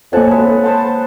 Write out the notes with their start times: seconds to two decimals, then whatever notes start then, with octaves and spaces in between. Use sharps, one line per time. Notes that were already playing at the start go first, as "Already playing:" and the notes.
0.13 F2 A#3 C#5 F#5 G#5 A5
0.31 D2 G#3 B4
0.64 B4 C5 F#5 A5